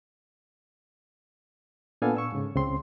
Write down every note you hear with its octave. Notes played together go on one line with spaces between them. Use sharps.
A#2 B3 D4 A4 F5 G#5
C#6 E6
G#2 C#3
C#2 C#3 C4 C6